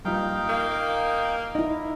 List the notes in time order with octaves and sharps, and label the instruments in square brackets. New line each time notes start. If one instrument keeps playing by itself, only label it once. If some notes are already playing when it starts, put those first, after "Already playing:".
[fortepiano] G2 A#2 [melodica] D#4 F5 G5
[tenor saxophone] A#3
[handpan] D#4 E4 [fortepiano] D#5